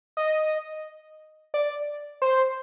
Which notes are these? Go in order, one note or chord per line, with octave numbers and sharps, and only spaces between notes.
D#5
D5
C5